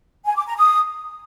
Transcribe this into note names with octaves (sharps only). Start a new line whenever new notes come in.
G#5
D6
A#5
D#6